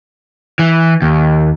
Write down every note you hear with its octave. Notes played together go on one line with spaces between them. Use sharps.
E3
D#2